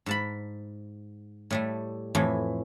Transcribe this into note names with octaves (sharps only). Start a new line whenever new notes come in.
G#2 A5 B5
A2 G3 A3
F2 A2 E3